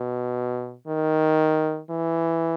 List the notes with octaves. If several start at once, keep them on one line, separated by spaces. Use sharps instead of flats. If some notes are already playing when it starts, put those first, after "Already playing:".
Already playing: B2
D#3
E3